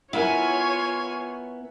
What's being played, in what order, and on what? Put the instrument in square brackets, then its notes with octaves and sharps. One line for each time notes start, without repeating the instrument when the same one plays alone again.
[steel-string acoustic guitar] B3 [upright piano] E4 A#4 [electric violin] F4 C#5 [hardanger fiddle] G#5